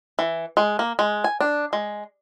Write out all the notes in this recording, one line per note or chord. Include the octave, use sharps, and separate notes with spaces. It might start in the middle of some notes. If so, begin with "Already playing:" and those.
E3
G#3
A#3
G#3
G#5
D4
G#3